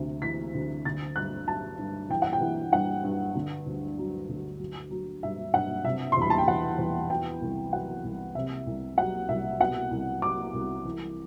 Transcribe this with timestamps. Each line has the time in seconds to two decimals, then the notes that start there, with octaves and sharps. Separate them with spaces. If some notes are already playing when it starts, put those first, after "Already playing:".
Already playing: D2 C3
0.22 E3 B6
0.54 D2
0.85 D3 A6
1.16 G2 F#6
1.47 F#3 A5
1.78 G2
2.09 E3 G5
2.22 F#5
2.33 G5
2.41 E3
2.73 G2 F#5
3.04 G2
3.35 D3
3.66 D2
3.98 F#3
4.29 D2
4.59 F#3
4.91 F#3
5.23 G2 E5
5.54 G2 F#5
5.85 C3 E5
6.12 C6
6.17 E2 B5
6.30 A5
6.38 G5
6.47 E3 F#5
6.78 E2
7.10 B2 G5
7.41 C2
7.73 F#3 F#5
8.04 C2
8.35 C3 E5
8.67 C2
8.98 F#3 F#5
9.29 C2 E5
9.61 B2 F#5
9.91 C2
10.22 F#3 D6
10.54 C2
10.85 E3